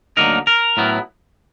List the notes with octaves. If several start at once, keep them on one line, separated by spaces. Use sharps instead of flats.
D2 D3 F#3 A#3 D#4 A#4
A#4
A2 F#3 B3 E4